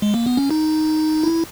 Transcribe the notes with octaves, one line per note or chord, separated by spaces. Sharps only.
G#3
A#3
B3
C#4
D#4
E4